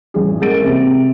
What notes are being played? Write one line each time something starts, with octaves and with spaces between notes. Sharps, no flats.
A1 G#4
G#3 A#3 A6 D7
C3